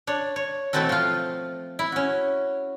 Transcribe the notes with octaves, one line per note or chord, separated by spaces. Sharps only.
D4 C#5
C#5
B2 E3 A3 C4 F#4 A4
F3 F4
E4
C#4 F#4